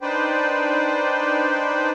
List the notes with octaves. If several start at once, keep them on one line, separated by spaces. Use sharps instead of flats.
D4 D#4 B4 C5 D5 G5